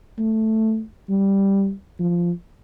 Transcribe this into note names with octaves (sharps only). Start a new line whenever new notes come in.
A3
G3
F3